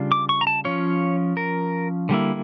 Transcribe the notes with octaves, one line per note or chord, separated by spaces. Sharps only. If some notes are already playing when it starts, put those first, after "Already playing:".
Already playing: C#3 G3 D4 F4
D6
C#6
A#5
A5
F3 C#4 F4 C#5
A#4
D3 G3 A#3 E4